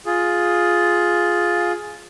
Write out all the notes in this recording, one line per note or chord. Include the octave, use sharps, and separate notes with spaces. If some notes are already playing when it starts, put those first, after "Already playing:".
F4 G#4